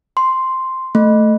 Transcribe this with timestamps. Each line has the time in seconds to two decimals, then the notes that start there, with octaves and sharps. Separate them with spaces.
0.17 C6
0.95 A3